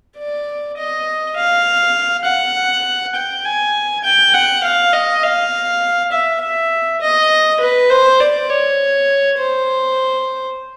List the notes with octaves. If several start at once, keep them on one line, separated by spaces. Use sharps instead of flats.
D5
D#5
F5
F#5
G5
G#5
G5
F#5
F5
D#5
F5
E5
E5
D#5
B4
C5
D5
C#5
C5